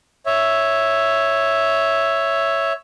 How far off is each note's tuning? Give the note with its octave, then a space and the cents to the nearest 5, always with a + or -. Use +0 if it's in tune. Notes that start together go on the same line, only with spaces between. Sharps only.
C#5 +0 E5 +0